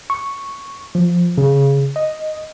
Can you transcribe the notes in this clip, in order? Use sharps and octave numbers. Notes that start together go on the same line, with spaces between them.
C#6
F3
C#3
D#5